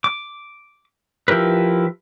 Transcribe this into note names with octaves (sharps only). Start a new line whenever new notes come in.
D6
F3 E4 G4 A#4 B4